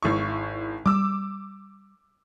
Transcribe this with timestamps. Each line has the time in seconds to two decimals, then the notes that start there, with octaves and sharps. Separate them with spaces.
0.03 G#1 E4 C#6
0.86 G3 D6 E6